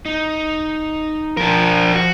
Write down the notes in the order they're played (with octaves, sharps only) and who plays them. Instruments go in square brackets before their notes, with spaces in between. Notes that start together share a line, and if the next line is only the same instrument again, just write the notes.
[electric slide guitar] D#4
[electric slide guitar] F3 A5 [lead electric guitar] D4 A#4
[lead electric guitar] F#4